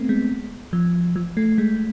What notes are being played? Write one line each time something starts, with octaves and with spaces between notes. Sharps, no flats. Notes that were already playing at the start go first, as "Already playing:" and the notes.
Already playing: A3 B3 C4
G#3
F3
F3
A3
G#3